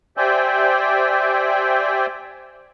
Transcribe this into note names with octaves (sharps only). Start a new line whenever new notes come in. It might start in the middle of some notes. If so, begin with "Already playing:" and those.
G4 C5 D5 E5 G5 G#5